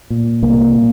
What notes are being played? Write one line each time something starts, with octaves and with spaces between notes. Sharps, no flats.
A#2
C2 A#3
A#2